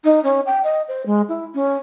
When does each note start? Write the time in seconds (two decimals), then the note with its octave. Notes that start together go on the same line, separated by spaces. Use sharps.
0.04 D#4
0.23 C#4
0.46 G5
0.64 D#5
0.88 C5
1.06 G#3
1.29 E4
1.55 C#4